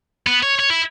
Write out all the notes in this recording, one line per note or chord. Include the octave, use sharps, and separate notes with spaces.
B3
C#5
C#5
E4